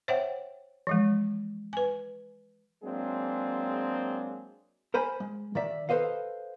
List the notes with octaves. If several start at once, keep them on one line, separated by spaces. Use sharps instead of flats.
C5 C#5 E5 F#5 G5
E3 F3 G#3
B4 G#5
F#3 G#3 A#3 C4 D4 G#4
A#4 C5 G#5 B5
G#3
D#3 D5 E5
A4 B4 C5 D#5 F5